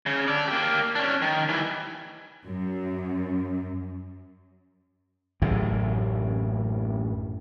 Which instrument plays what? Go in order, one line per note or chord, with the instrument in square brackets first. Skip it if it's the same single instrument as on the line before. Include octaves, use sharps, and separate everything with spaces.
[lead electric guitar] C#3
A4 D5
A#3 G4
C#4 D4
D#3
E3 G3
[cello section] F#2
[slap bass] A1 F#2 A2 C#3